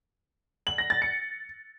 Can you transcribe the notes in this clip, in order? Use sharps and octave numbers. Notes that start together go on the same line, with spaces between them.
F#7
A#6
A6
C#7